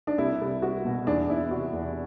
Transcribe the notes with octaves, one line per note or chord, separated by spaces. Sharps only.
D4
C2 E4
C2
C2 F#4
B2
E2 D4
E2 E4
C3 F#4
E2